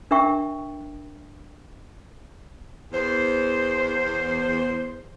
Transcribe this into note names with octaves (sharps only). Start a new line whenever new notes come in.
D4 A#4 E5 G5 C#6
E2 C5